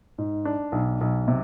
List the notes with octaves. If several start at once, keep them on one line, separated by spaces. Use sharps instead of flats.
G#2
D4
B1
B1
C3